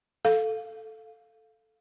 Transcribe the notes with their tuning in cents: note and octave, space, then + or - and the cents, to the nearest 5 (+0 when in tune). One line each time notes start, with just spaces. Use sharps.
A4 +0 F5 +5